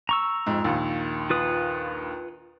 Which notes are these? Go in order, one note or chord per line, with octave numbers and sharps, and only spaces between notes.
A#5 C#6 E6
F2 G#2
A#1 D#2
F4 B4 D#6